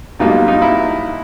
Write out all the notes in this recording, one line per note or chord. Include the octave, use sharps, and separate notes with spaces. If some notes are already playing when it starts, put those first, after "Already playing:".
B1 B2 G3 A#3 D#4 F4
D#4 F4
E4